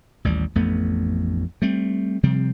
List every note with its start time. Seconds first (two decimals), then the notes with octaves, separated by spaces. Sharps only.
0.25 A1 D#2 G3
0.55 A1 F2 A3 B3
1.62 G3 A3 C4
2.23 C3 F3 G3 C4